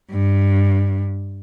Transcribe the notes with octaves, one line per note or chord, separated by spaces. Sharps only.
G2